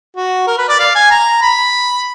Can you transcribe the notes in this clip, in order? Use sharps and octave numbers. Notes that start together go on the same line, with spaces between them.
F#4
A#4
B4
D5
F5
G#5
A#5
B5